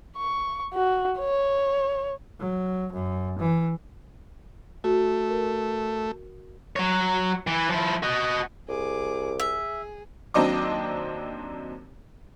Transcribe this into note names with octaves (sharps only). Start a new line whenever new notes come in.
C#6
F#4
C#5
F#3
F#2
E3
A3 F#4
A#4
F#3 C#5
E3
F3 E4
F#4 D#5
C2 G#4 D6
G#4 E5
D#2 F#3 C4 D4 D#5 D6